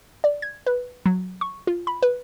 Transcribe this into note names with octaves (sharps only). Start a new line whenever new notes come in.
D5
G#6
B4
F#3
C#6
F4
B5
B4